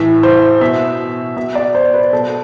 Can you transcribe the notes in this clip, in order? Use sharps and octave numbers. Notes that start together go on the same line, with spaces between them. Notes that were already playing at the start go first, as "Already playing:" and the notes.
Already playing: A2 E3 E5
C5
B2 E5
B2 E5
D5
C5
B4
B2 A4